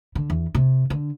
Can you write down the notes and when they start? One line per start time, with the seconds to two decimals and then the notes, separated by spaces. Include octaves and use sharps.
0.15 D3
0.30 E2
0.55 C3
0.90 D3